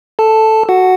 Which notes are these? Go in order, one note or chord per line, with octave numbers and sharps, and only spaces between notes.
A4 A5
F#4 F#5